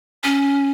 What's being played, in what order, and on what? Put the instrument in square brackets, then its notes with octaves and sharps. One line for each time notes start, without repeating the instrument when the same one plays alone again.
[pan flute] C#4